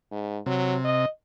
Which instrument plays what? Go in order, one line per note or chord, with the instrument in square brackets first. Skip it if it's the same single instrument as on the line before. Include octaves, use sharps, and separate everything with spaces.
[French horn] G#2
[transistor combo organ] C3 [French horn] F#3
[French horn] D#5